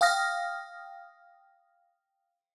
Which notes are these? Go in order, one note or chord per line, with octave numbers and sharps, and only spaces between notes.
F5 G5 D#6 F6 A#6